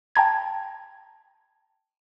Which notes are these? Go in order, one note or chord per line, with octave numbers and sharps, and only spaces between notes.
G5 A5 A#5 G#6